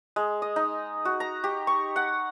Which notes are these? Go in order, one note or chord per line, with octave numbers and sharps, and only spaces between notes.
G#3
D#5
D#4
F#4
A#5
G4
C#6
F#5